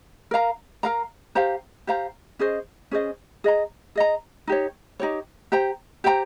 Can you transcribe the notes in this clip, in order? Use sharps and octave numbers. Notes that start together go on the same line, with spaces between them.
A#4 F5 A#5
A#4 F5 A#5
G4 C5 F5 A#5
G4 C5 F5 A#5
C#4 G#4 C5 D#5
C#4 G#4 C5 D#5
G#4 D#5 A#5
G#4 D#5 A#5
D#4 G4 C#5
D#4 G4 C#5
G4 C5 G5 A#5
G4 C5 G5 A#5